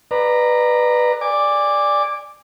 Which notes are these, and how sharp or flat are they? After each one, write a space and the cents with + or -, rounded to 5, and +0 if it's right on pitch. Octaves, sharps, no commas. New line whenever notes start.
B4 +0 D5 +35 A#5 +0
D5 +0 G#5 -25 D6 +0